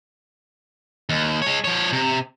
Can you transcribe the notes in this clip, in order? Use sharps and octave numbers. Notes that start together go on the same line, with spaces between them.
D#2
G#3 C#5
F3 C#5
C3